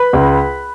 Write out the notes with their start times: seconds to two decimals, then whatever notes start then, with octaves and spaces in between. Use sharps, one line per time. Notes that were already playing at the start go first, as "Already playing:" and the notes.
Already playing: B4 B5
0.13 C#2